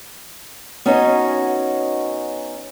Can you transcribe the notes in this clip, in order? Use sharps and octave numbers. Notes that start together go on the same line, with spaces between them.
B3 C#4 D#4 F#4 C#5 D#5